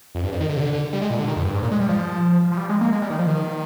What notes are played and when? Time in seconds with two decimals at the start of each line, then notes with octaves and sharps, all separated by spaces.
0.15 F2
0.24 G2
0.32 F2
0.40 D#3
0.49 D3
0.57 C3
0.61 D3
0.73 D3
0.93 G3
1.02 G#3
1.10 A#2
1.19 D3
1.28 D#3
1.36 F2
1.45 G2
1.53 G#2
1.63 A#2
1.72 G#3
1.80 G3
1.89 F3
2.52 F3
2.57 G3
2.69 G#3
2.81 A#3
2.92 G#3
3.02 G3
3.10 D#3
3.19 F3
3.27 D#3